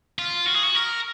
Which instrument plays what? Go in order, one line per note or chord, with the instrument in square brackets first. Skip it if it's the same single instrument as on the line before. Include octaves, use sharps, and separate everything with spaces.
[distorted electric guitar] F4
F#4
G#4
F#4
A#4